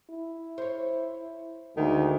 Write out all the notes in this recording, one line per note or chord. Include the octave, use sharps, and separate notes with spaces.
E4
C5 C#5
D2 D#3 G#3